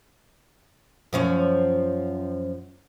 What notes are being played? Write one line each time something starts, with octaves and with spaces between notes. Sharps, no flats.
F#2 F3 C#4